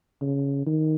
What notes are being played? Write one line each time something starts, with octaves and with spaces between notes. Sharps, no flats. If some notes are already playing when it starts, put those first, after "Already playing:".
C#3
D#3